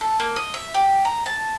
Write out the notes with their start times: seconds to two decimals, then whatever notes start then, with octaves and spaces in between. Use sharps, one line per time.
0.01 A4
0.20 A#3
0.36 D#5
0.54 E5
0.74 G4
1.05 A#5
1.26 A5